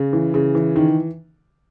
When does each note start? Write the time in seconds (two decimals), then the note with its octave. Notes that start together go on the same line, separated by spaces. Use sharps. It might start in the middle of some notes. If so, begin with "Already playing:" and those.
Already playing: C#3
0.13 E3
0.34 C#3
0.55 E3
0.76 D#3